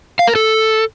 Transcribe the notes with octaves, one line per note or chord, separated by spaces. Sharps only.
F5
A#4
A4